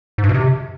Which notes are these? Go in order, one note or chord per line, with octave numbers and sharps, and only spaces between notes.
G#2
G2
B2
C3